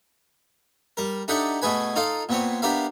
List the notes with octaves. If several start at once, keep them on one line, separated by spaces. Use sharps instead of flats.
G3 A#4
D4 D#4 G4 A4 E5 F#5
B2 A3 G#4 B4 G#5
D#4 F4 A4 F5
A#2 B3 C4 C#5
B3 D4 G4 A#4 E5 F5